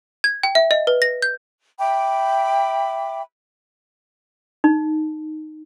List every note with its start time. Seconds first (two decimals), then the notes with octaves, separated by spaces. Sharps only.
0.24 G#6
0.43 G5
0.55 E5
0.71 D#5
0.87 B4
1.02 A#6
1.22 G6
1.79 E5 G5 B5 D6
4.64 D#4